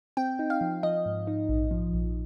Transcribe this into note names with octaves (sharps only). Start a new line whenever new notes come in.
C4 G5
D#4
F5
F3
F3 D#5
G#2
D#4
A#1
F3
A#1